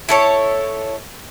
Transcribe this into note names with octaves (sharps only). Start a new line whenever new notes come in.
E4 A4 C#5